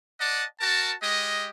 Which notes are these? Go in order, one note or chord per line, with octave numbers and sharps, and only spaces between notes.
D5 D#5 F#5 A5
F#4 A#4 A5
G#3 G4 D#5